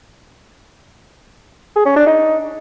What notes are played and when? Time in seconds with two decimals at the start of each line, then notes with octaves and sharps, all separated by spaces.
1.76 G#4
1.86 C#4
1.96 D4
2.07 D#4